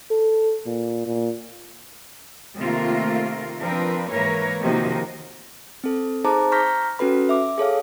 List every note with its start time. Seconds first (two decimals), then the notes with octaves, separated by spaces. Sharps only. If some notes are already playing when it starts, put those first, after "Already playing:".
0.11 A4
0.66 A#2
1.06 A#2
2.59 C3 D#3 A3 A#3 F4 A#4
3.59 F3 C4 D4 A#4 B4
4.10 G#2 E3 A#3 A#4 B4 C#5
4.62 C3 D#3 F3 A#3 D#4 F#4
5.84 C4 A4
6.24 D#4 G#4 C5 A5 A#5 D6
6.52 A#5 C#6 F6 G6 A#6 B6
6.99 C#4 F#4 A4 B4 B5
7.29 E5 D6
7.58 G#4 A4 C#5 F5